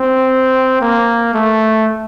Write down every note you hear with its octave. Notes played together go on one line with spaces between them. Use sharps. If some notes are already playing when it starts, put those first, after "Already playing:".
Already playing: C4
A#3
A3